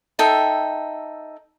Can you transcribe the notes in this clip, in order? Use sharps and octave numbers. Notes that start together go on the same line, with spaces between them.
D#4 A4 E5 G5